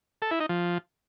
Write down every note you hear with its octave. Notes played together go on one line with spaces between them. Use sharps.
A4
E4
D#4
F3